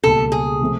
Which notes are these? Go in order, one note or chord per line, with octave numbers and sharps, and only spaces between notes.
C#2 B2 G3 A#3 A4
G#4
C3 F3 A3 C4